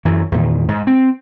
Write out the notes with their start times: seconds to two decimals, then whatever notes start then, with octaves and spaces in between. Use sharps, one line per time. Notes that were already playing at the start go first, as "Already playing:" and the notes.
0.05 F#2 E3 F#3
0.32 E2 A#2 D#3
0.68 G#2
0.87 C4